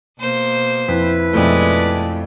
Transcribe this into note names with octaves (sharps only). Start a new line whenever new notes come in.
B2 A#3 C5
F2 E4 B4
F2 B2 F3 G#3 A3 D5